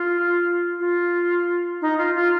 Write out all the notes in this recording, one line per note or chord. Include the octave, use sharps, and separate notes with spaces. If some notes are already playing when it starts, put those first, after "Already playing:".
Already playing: F4
F4
D#4
F4
F4